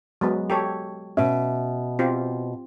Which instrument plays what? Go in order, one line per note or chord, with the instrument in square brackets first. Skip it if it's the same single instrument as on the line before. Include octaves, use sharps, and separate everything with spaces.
[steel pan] F#3 G#3 B3
G4 A4 C#5
[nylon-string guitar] B2 E5 [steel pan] C#4
[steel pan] C4 F4 G4